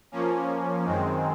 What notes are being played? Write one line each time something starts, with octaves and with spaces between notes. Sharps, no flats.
F3 A#3 C#4
F#2 D#3 G#3 C4